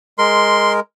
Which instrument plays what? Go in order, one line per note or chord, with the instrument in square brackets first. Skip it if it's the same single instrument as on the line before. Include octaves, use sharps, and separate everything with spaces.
[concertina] G#3 A#4 [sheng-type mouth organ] C6